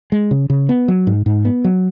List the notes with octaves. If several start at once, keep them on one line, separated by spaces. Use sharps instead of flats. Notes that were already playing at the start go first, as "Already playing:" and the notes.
G#3
C#3
C#3
B3
F#3
G#2
G#2
B3
F#3